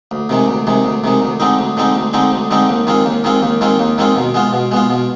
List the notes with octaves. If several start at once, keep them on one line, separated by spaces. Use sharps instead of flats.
D2
C3 D#3 G#3
D2
C3 D#3 G#3
D2
C3 D#3 G#3
D2
D3 G#3 C4 D#4
D2
D3 G#3 C4 D#4
D2
D3 G#3 C4 D#4
D2
D3 G#3 C4 D#4
D#2
D#3 G#3 C4 F4
D#2
D#3 G#3 C4 F4
D#2
D#3 G#3 C4 F4
D#2
D#3 G#3 C4 F4
B2
G#3 B3 F4
B2
G#3 B3 F4
B2